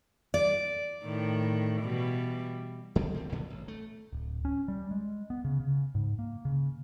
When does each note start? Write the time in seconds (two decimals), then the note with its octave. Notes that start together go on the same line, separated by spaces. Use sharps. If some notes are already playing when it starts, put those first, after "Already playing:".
0.34 D5
1.03 A2 D#3
1.81 B2 E3 G3
2.96 G2 D3 D#3 C4
3.14 C2 G3 C4
3.32 A#2 D3 F#3 B3
3.50 A1
3.68 A3
4.13 D1
4.45 C#4
4.68 G3
4.91 G#3
5.30 B3
5.44 C#3
5.60 C#3
5.95 G#2
6.19 A#3
6.45 C#3